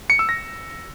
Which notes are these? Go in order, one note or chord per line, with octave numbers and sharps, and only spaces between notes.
C#7
E6
A#6